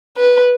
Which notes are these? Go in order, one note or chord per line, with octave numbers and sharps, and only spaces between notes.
B4